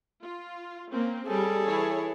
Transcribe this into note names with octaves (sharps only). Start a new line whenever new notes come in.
F4
A#3 C4 C#4
G3 C#4 G#4 A4
E3 E4 C#5